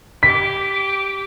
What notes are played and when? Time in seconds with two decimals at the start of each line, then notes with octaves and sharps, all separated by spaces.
0.23 G4 D6 B6